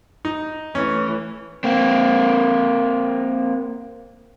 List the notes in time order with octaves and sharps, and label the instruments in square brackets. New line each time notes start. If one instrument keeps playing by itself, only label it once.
[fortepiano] D#4
[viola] E3 A3 [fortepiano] C#4
[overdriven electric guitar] A#3 C4